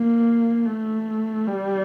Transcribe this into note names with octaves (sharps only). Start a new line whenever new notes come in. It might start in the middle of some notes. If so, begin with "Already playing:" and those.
Already playing: A#3
A3
G3